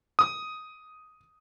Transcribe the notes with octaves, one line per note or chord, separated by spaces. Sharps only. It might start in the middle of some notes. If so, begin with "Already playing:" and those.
D#6